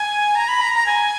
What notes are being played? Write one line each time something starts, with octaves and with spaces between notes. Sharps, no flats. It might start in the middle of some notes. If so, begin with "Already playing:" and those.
Already playing: G#5
A#5
B5
A#5
A#5
G#5